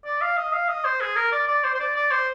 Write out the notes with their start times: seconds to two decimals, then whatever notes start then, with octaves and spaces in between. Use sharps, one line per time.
0.05 D5
0.21 F5
0.37 D#5
0.53 F5
0.69 D#5
0.85 C5
1.01 G#4
1.16 A#4
1.32 D5
1.48 D5
1.64 C5
1.75 C5
1.80 D5
1.96 D5
2.11 C5